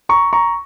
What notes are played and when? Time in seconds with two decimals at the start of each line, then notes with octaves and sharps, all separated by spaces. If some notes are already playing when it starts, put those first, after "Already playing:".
0.09 A#5 C#6
0.33 A#5 C#6